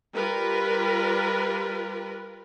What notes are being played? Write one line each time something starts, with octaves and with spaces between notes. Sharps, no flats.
G3 F4 A#4 B4